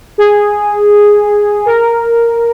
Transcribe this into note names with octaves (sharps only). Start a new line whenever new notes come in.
G#4
A#4